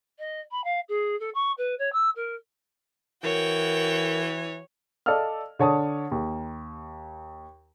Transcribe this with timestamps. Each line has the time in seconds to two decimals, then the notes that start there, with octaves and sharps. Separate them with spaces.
0.19 D#5
0.51 B5
0.64 F5
0.89 G#4
1.20 A4
1.35 C#6
1.58 B4
1.79 C#5
1.93 E6
2.16 A#4
3.24 E3 F#4 A#4 C#5 G5
5.06 A4 D5 D#5 F5 E6 F6
5.59 D3 C#5 A5 D#6
6.11 D#2